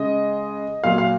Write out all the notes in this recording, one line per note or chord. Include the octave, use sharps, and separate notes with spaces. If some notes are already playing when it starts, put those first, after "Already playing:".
Already playing: C#3 G#3 D#5
A#2 F#3 F5
F5